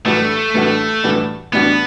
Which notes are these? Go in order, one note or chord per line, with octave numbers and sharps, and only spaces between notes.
A2 E3 G3 A3 D4 F#4
A2 E3 G3 D4 F#4
A2 E3 G3 D4 F#4
A2 E3 G3 B3 D4 F#4